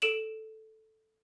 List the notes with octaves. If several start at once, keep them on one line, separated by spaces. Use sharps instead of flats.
A4 D7 E7 F#7